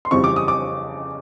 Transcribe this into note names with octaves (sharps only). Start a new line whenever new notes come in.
C6
F2 C#3 E3 G3 C4 C#6
D6
D#6
D6